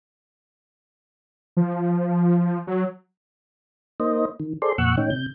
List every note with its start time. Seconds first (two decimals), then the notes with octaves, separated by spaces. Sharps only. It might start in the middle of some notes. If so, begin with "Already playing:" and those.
1.57 F3
2.67 F#3
4.00 A#3 D#4 C5 D#5
4.40 D#3
4.62 G#4 A4 C5 D5 C6
4.78 F2 A#2 F#5 C#6 E6 F#6
4.97 A2 D#3 C#4 D#4 G5
5.10 C3 G6